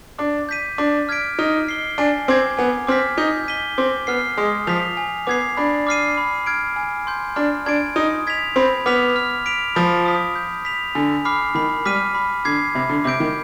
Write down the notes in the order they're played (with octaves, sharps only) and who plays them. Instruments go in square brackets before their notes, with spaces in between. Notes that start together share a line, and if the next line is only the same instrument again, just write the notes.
[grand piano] D4 [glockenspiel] D6
[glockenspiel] G6 B6 D#7
[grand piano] D4 [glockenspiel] D6
[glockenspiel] F6 G#6 B6 D7
[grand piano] D#4 [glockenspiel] F6
[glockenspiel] C7 G7
[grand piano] D4 [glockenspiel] G#5
[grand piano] C4 [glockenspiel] D6 G#6
[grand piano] B3 [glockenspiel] G#5
[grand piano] C4 [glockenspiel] D6 F6 B6
[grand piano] D#4 [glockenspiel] G6
[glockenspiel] B6 D#7 G7
[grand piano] C4 [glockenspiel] D6
[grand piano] B3 [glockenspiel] F6 C7
[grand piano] G#3 [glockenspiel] D#6
[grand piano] F3 [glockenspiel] B6 F7
[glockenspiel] G#5
[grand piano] B3 [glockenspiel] D6 G#6 C7
[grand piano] D4 [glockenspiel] B5
[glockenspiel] D6 F6 C7 D#7
B5
F6 G#6 D7
G#5
C6 G6
[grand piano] D4 [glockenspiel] F6
[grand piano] D4 [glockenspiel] G#6 D7
[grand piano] D#4 [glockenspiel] D#6
[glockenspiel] G#6 B6 F7
[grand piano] C4 [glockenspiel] B5
[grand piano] B3 [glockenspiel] D6 F6 B6 F7
[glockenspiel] F6
B6 D7 F7
[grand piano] F3 [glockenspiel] B5
[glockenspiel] D#6 B6
G6
B6 F7
[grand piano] D3 [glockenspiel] G#5
[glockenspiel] B5 D6 F6 C7
[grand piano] D#3 [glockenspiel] B5
[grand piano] G3 [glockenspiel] D6 F6 B6 D#7
[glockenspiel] B5
[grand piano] D3 [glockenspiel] D6 G#6 C7
[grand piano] C3 [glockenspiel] B5
[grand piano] D3
[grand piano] C3 [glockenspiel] D6 G6 D7
[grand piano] D#3